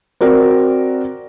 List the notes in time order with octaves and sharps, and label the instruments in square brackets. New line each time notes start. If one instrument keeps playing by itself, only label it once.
[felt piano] C4 F#4 A#4 D5